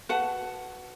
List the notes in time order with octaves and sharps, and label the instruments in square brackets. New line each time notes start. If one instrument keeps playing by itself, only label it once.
[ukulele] F#4 B4 F#5 A5